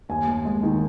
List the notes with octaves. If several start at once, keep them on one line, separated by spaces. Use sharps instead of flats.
D#2 G#5
D#2
G#3
D#3